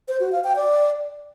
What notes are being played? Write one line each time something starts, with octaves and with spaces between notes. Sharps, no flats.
C5
F#4
F5
G5
D5